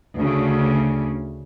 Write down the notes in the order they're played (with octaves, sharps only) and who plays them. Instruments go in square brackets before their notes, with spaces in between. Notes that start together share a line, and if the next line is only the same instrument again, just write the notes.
[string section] D2 C#3